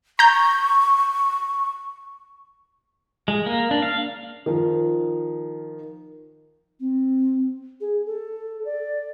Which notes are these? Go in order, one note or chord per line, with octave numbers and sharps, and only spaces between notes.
A#5 C#6 G6
G#3
A#3
D4
F5
D#3 F3
C4
G#4
A4
D5